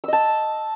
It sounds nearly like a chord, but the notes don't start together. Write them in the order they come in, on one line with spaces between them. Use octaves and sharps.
E6 D#5 A5